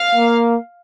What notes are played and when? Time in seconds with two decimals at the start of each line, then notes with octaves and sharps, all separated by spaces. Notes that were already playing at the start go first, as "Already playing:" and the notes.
Already playing: F5
0.15 A#3